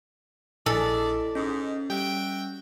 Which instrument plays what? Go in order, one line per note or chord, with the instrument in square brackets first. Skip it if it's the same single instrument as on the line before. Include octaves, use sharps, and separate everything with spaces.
[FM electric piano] A#1 [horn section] D4 G#4 D5 [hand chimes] E4 D#5 B6 [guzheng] A4
[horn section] G#2 [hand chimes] C#4 [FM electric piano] D#5
[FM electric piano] G3 [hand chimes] C#4 [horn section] F#4 E5 G5